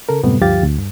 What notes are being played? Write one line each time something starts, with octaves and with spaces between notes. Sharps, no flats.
C#3 A4 A#4
F#2 A2 C3 G3 A3 B3
D2 G2 F3 G4 F5 A6
D2
G2